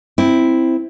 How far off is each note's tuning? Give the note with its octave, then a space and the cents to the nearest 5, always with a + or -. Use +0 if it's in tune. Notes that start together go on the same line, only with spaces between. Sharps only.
C4 +0 E4 +0